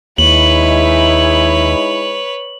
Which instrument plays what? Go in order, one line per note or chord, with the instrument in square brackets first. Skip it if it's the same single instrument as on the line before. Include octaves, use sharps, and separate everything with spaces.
[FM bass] D#2 [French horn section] G#3 D#4 E4 [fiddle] B4 C#5 [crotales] F#7